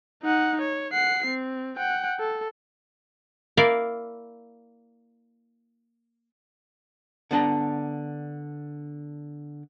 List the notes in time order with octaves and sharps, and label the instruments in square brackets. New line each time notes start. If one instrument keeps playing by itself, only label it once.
[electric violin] D#4 F#5
C#5
F#5 C7
C4
F#5 G5
A4
[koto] A#3 E4 A#4 D5 F5
[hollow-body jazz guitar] D3 B3 D4 A5 A#5